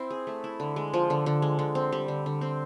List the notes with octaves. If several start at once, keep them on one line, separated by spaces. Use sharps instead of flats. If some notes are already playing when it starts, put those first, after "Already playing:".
Already playing: C4 E4
G#4
A3
E4
D3
G#3
F3
D3
D3
G#3
D3
C4
G3
D3
D3
C4